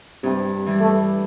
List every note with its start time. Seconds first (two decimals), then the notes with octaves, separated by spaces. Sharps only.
0.23 G2 C3
0.66 E3 G3 D4
0.80 A3